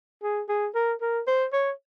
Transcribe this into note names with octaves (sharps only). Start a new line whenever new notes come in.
G#4
G#4
A#4
A#4
C5
C#5